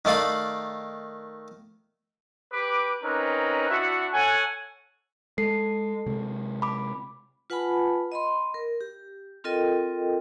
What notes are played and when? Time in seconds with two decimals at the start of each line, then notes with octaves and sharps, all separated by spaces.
0.05 D#3 A3 D5 F5 B5
2.53 G4 B4 D6
3.03 C4 C#4 D#4 A#4 B4
3.71 D4 E4 F#4 E5 F#5
4.14 A4 C#5 F#5 G#5
5.38 G#3 A4 C7
6.06 C3 G#3
6.62 B5 D6
7.50 F4 B4 F#5 G#5 A5 B5
8.12 D#5 B5 C6
8.54 A#4
8.81 G4
9.44 C4 F4 A4 A#4 D#5 G5